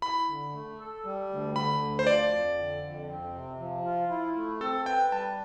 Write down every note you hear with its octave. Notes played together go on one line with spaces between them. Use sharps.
E4 B5
D3
A3
A4
G3
D2
D3 B5
D2
C5
F3 D5
F2
D3
F2
C4
C3
F3
F4
E4
A3
C4 A4
B4 G5
G3 A5